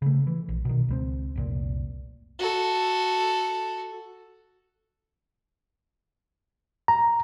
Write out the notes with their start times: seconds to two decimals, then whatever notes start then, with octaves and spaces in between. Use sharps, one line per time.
0.02 C#3 A3
0.27 E3
0.49 A#1
0.65 B2 D#3
0.89 C#2 G3 C4
1.36 F1 C2 A#2
2.39 F#4 A4
6.88 A#5